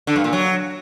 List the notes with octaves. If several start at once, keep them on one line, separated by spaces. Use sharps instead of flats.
D3
G2
A#2
F#3